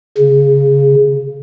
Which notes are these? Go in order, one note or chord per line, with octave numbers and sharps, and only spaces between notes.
C#3